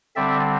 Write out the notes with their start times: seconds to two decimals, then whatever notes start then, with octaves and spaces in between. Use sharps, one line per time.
0.16 D3 G3 C4 D5 E5